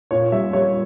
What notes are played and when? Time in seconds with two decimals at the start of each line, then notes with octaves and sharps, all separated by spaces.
0.11 A#2 C#5
0.32 G3 E5
0.53 G3 C#5